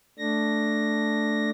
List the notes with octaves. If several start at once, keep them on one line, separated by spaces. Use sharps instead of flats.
A3 D4 A#6